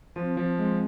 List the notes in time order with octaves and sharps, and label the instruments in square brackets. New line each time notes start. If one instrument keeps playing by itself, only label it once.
[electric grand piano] F3 [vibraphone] C4
[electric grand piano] F3
G#3